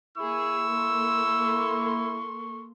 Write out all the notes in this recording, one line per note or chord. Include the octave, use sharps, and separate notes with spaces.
A#3 E4 G#4 C#6 E6
A#3 A4 C6